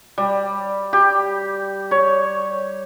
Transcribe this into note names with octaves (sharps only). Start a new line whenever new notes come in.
G3
G4
C#5